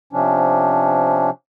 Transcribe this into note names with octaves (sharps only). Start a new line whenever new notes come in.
C3 F3 C#4 D4